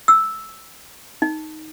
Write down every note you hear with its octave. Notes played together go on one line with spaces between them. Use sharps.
E6
D#4